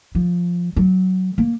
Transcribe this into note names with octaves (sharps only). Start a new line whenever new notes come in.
F3
F#3
A#3